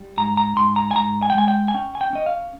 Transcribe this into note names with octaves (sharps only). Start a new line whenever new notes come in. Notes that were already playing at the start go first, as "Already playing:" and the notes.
Already playing: G3
G#2 A#5
A#5
G#2 C6
A#5
G#5
G#2 A#5
G#5
G5
G#3 G#5
G5
G#5
C#4 G5
G#5
G5
C#4 D#5
F5